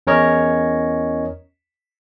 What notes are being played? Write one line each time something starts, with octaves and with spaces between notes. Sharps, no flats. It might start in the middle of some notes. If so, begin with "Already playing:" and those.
E2 C#4 A#4 C#5 D#5